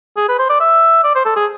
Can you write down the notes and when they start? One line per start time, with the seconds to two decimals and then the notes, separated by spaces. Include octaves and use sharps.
0.17 G#4
0.29 B4
0.39 C5
0.49 D5
0.60 E5
1.04 D5
1.15 C5
1.25 A4
1.36 G#4